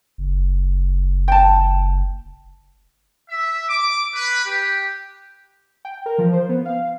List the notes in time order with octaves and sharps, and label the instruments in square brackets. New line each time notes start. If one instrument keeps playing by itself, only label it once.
[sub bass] F#1
[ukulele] G5 A5
[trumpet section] E5
D6
B4
G4
[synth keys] G5
A#4
F3
C5
B3
F5